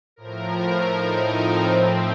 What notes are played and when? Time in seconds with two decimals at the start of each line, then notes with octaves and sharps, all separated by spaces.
0.16 A2 F3 A#4
0.91 D#4
1.28 C4
1.65 A2 F3 C4